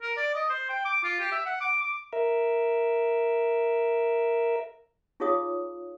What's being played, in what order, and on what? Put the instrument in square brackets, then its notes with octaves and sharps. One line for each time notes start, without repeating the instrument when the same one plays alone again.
[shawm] A#4
D5
D#5
C5
G5
D6
F4
G4
E5
F#5
D6
D6
[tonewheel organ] A#4 E5
[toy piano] D#4 F4 G#4 C#5 F5 D#6